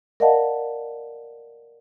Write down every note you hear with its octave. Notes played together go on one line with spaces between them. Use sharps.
A#4 D5 D#5 F5 F#5 A5